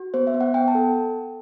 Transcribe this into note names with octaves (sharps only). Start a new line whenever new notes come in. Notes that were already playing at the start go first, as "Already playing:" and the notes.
Already playing: F#4
B3 C5
E5
B3
F#5
B3 G5
A5
A4